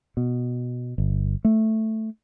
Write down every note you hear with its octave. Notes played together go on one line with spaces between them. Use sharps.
B2
G1
A3